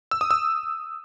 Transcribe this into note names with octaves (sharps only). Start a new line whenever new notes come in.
E6
D#6
E6